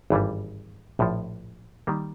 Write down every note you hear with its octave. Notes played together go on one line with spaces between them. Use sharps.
G#1 G2 E3 G3
A#1 A2 F3
D#3 G3 A#3